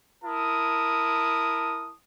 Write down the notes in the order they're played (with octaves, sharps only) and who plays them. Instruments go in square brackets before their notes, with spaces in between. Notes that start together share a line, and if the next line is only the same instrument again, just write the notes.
[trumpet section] E4 A#4 A5 D#6